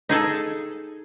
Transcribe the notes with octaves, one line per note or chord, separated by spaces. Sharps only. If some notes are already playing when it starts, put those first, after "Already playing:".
D#4 G#4 A4